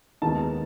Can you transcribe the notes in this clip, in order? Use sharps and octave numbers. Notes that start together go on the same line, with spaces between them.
D#2 D#3 G#3 B3 D#4 A5